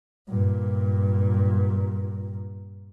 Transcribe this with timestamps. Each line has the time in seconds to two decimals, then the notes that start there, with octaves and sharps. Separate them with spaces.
0.30 G2 A#2